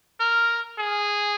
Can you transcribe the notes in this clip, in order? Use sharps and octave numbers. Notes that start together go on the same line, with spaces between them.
A#4
G#4